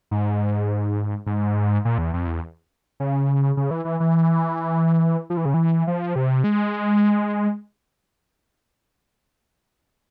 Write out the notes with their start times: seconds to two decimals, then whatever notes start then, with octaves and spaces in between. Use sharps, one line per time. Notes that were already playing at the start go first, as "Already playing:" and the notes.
0.11 G#2
1.26 G#2
1.85 A#2
1.98 E2
2.14 F2
2.27 E2
3.00 C#3
3.57 C#3
3.71 E3
3.85 E3
4.00 E3
5.30 F3
5.37 E3
5.45 C#3
5.54 E3
5.87 F3
6.16 C3
6.44 G#3